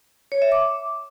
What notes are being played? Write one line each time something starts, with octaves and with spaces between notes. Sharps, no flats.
C#5
E5
D6